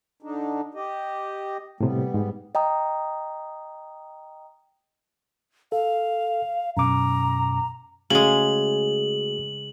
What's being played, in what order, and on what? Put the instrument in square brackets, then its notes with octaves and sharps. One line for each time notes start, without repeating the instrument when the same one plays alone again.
[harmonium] D3 D4 D#4
G4 D#5
[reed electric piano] A2 C3 [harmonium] G3 B3
[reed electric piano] G#2
[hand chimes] D#5 G5 A#5 D#6
[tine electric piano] A4 [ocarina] F5
[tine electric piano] F#2 B2 D6 [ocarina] A#5
[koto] C#3 G#3 [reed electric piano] A3 F#4 G#4 [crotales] F#7